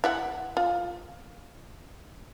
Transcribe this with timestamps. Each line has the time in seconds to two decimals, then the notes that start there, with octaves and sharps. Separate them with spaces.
0.04 E4 E5 F#5
0.57 F4